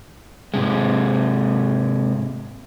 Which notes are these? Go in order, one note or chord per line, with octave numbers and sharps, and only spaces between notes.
G#2 C3 G#3